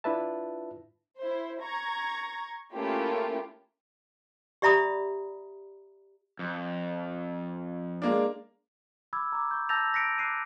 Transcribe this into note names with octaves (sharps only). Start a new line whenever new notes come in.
D4 E4 F4 B4 E5 A5
E4 C5
A#5 C#6 G#6
A3 A#3 C#4 E4 F4 G4
G4 D5 E5 A#5 B5 D#6
F2
G#3 A#3 D4
B5 D6 E6 G#6
A#5 D6
C#6 G6
A5 E6 G6 A6 A#6 F7
F#6 A#6 B6 C#7 D7
D6 F#6 C7 D7 D#7